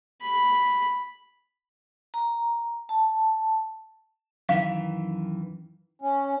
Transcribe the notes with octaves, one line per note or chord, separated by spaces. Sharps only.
B5
A#5
A5
F#2 D#3 E3 F5
C#4